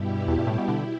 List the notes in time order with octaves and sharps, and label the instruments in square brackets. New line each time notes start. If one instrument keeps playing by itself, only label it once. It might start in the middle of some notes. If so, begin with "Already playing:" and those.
Already playing: [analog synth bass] G2 [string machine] B2 G3 E4 G4
[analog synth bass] E2
G2
A2
B2
[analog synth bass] D3 [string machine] E4